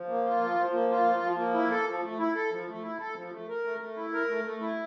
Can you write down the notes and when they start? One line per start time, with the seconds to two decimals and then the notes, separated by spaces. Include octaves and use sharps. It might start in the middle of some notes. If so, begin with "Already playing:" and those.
Already playing: F3
0.09 A#3
0.24 F4
0.41 F3
0.57 F3
0.73 A#3
0.90 F4
1.05 F3
1.22 F3
1.38 A#3
1.54 E4
1.71 A4
1.87 F3
2.03 A3
2.19 E4
2.35 A4
2.52 F3
2.68 A3
2.83 E4
3.00 A4
3.16 F3
3.32 A3
3.48 A#4
3.64 A3
3.80 A3
3.97 E4
4.13 A#4
4.30 A3
4.45 A3
4.61 E4